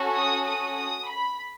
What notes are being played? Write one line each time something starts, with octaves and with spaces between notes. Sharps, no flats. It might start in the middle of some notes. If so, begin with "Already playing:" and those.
Already playing: C#4 F#4 A4
D#6
D#6
D#6
B5